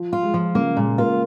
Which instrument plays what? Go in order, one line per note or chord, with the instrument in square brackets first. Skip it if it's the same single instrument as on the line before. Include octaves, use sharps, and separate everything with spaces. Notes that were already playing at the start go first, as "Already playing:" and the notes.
Already playing: [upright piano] F3
[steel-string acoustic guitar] F4
[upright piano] G#3
[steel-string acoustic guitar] F3
[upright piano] C#3 [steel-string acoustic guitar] A#3
[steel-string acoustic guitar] A#2 [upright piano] G#3
[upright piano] A#3 [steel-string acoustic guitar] F4